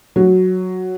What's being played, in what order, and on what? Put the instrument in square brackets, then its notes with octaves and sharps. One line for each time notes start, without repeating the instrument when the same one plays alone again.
[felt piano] F#3